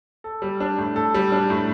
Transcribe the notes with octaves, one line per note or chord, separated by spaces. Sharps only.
A4
G3
D4
A2
A4
G3
D4
A2